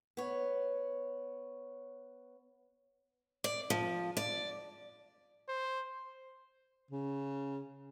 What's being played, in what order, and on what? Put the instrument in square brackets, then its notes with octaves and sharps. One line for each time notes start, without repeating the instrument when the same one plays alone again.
[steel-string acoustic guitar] B3 C#5
D5
F3
D5
[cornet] C5
[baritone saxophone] C#3